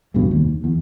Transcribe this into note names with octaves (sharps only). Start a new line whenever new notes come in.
F1 C#2 G2 B2
D#2
E2